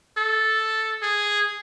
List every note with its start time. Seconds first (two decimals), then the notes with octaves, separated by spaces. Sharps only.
0.17 A4
1.02 G#4